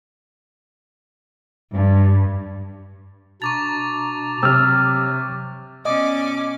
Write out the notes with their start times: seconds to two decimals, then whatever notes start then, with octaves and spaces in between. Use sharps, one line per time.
1.74 G2
3.42 B2 D4 A#5 C#6 D6 A6
4.43 C3 F#3 E6 F6
5.85 B2 C#4 D5 D#5 G#5 D6